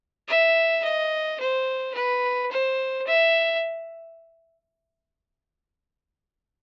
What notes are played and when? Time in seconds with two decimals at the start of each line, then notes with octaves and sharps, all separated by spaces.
0.28 E5
0.84 D#5
1.40 C5
1.95 B4
2.51 C5
3.07 E5